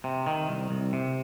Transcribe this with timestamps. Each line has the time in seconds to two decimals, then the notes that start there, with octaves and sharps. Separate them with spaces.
0.04 C3
0.27 D#3
0.49 C2
0.71 C2
0.93 C3